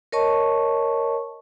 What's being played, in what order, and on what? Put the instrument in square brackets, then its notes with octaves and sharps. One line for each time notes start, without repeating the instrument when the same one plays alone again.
[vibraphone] A#4 C#5 D#5 A5 C#6